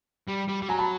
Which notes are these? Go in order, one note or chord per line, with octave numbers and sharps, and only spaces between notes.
G3
G3
G3
F#3 G#5 A#5
A5 B5